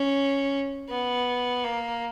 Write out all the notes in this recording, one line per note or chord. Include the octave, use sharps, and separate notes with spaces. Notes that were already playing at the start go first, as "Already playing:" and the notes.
Already playing: C#4
B3
A#3